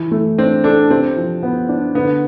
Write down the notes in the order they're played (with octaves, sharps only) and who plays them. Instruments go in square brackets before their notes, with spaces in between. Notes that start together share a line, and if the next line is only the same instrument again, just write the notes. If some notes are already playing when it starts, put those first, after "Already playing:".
Already playing: [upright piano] E3
A3
[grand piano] C4 [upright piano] D4
[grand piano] D4 [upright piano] A4
[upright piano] C3 [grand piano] C4
[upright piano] F3
B3
D4
[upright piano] D3 [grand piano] B3